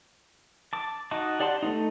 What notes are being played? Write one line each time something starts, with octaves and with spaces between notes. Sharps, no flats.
A5 D6
D#4 F#4 D#5 A5 D6
G4 D5 F#5 A5 C6
A3 C4 D#4